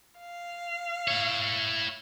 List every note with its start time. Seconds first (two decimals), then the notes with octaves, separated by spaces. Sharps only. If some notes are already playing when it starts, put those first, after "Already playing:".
0.19 F5
1.08 E4 C#5